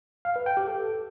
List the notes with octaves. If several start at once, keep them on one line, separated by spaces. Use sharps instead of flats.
F5
B4
G5
G4
A4